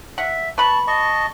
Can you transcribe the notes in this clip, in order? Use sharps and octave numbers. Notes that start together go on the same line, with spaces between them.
E5 F#5
B4 A5 B5 C#6
D#5 A5 C#6